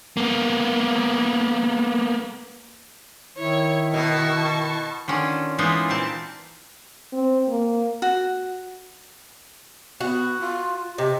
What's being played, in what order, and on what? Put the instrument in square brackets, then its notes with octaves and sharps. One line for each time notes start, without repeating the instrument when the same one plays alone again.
[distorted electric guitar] A#3 B3
[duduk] D#3 [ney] E4 [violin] C#5
[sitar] B2 [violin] A5 C#6
[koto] D3 D#3 C#4 F4
E3 G#3 A#3 B3 D#4 F4
A#2 C4 A5
[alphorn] C4
A#3
[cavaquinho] F#4
[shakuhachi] B3 [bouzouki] F#4
[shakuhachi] F4
[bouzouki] C3 [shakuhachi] D#5